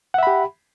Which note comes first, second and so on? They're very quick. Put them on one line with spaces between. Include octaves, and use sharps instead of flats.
F#5 E5 B5 G4